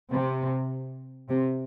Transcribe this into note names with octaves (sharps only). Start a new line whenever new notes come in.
C3
C3